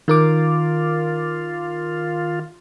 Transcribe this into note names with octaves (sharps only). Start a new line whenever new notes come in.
D#3 F4 A#4 D6